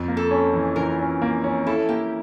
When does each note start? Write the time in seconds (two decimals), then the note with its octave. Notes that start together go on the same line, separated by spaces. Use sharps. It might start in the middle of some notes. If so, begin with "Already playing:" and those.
Already playing: F2
0.08 A#3
0.17 A4
0.31 C#4
0.53 E3
0.76 E3 A#4
0.99 C#4
1.22 A#3
1.44 C#4
1.67 E4 A4
1.89 A#3 G4